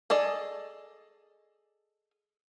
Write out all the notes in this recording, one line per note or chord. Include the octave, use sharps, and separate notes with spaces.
G#4 A4 D5 D#5